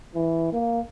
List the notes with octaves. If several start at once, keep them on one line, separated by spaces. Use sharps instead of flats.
E3
A#3